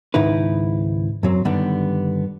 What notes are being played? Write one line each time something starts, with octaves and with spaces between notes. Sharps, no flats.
C#2 G#2 D#3 D#4 E4 B4
F#2 F#3 C4
G2 D3 D#3 G3 B3 D4